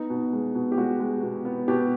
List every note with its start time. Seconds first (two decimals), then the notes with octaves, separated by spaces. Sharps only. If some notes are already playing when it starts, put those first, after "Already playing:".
Already playing: B3 D#4
0.10 B2
0.33 G#3
0.55 B2
0.72 G4
0.77 G#3 F#4
1.00 G#3
1.23 B2
1.45 B3
1.68 B2 G4